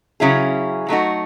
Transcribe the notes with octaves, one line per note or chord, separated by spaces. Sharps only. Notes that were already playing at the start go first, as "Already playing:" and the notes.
C#3 F#3 C#4 E4 G#4
F#3 A3 D#4 F#4